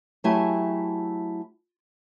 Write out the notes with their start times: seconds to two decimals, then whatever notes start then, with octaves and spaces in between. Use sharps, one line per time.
0.24 F#3 A3 E4 G4 G#5